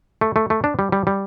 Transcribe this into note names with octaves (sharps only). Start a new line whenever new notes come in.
A3
A3
A3
D4
G3
G3
G3